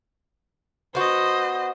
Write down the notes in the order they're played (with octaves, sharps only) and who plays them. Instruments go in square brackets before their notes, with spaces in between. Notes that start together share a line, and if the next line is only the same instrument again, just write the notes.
[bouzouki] B3 F#4 [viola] C5 D#5